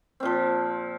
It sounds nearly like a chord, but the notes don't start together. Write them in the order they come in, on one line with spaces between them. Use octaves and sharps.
C4 A#2 F3